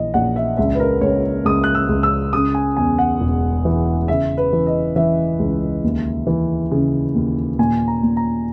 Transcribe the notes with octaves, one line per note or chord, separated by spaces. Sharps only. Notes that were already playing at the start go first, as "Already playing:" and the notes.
Already playing: A#1 E3 D#5
A#1 F#5
E5
C#2 E5
B4
A#4
C#2 C#5
C#2 D#6
F#6
E6
C#2
E6
C#3 D#6
G#5
E2 G#5
F#5
E1
E3
C#3 E5
B4
E3
D#5
E3 E5
C#2
D#2
E3
C#3
D#2
A#2 G#5
A#5
A#2
A#5